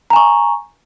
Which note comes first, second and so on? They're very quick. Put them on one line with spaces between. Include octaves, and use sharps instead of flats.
A#5 G#5 C#6